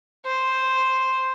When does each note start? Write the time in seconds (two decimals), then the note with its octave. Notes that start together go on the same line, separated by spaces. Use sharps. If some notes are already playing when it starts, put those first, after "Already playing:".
0.26 C5